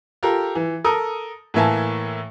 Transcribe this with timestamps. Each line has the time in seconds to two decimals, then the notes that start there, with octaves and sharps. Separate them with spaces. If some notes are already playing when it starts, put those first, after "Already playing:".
0.23 F4 G4 A4 A#4
0.55 E3
0.84 A4 A#4 D#6
1.54 A2 E3 A#3 E5 G#5 A5